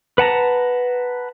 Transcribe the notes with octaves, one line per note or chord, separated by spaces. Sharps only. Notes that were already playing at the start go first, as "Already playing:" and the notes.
B4 F#5 A5 A#5